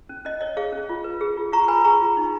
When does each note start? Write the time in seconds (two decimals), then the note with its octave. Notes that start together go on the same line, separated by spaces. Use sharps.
0.09 C#4
0.25 C#4 D#5
0.41 C#5 D#5
0.57 G#4 C#5 F5
0.72 C#4
0.89 F4
1.04 B4
1.21 G#4
1.37 F4
1.53 F4 A#5 C#6
1.68 B4 G#5 B5
1.84 G#4 A#5 C#6
2.01 F4
2.17 D#4